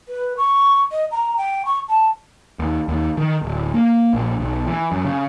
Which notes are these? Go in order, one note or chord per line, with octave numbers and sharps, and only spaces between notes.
B4
C#6
D#5
A#5
G5
C#6
A5
D#2
D#2
D#3
D1
A#3
A#1
B1
E3
F#2
C#3